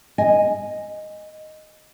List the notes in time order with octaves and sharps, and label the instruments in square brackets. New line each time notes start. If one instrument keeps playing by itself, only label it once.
[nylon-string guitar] D#5 G#5